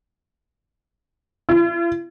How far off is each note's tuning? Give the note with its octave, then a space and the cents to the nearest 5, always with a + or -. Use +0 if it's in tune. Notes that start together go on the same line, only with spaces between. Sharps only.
F4 -45